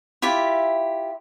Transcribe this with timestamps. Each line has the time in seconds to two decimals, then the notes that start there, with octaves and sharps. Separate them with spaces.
0.22 E4 F4 G4 E5